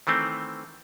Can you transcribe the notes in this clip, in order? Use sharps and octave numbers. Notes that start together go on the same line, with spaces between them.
D#3 E3 A3 C4